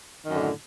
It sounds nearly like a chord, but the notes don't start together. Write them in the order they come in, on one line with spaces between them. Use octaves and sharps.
D#3 F#2 D3 A2